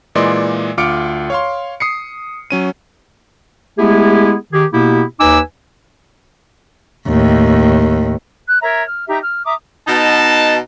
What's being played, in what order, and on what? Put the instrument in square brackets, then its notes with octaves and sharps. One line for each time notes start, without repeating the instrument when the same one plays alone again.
[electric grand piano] A#2 E3 G#3 D5 D#5 C6
D2 F4 D6 F6 C#7 D7
C#5 F5 C6
D#6 C7 C#7
F#3 C#4 D#7
[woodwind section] G#3 A3 B3 E4 G4 G#4
D#3 G4 G#4
B2 A#3 B3 E4 G4
D#2 D#4 B4 G#5 D6 E6
[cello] D#2 A2
[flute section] F#6
A#4 C#5 E5 A#5
F6
D#4 G4 E5 A#5
F6
E5 A#5 D6 D#6
[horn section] B2 D#4 A5